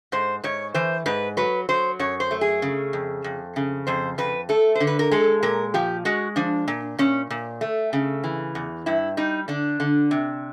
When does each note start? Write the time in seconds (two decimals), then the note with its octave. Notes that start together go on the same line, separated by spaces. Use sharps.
0.12 G#2 C5
0.44 G#2 C#5
0.74 E3 C5
1.06 G#2 B4
1.37 F#3 B4
1.69 F#3 C5
1.99 F#2 C#5
2.20 C5
2.31 A3
2.41 G#4
2.62 C#3
2.93 F2
3.24 F2
3.56 C#3
3.87 F2 C5
4.18 F2 B4
4.49 A3 A4
4.75 C5
4.80 D3
4.87 B4
4.99 A#4
5.11 G#3 A4
5.43 A#2 A#4
5.74 F3 G4
6.05 G#3 F#4
6.36 F3 D4
6.68 A#2
6.99 A#2 C#4
7.30 A#2
7.61 A3
7.93 C#3
8.24 E3
8.55 E2
8.86 G2 E4
9.17 G3 D#4
9.48 D3 D4
9.80 D3
10.11 C3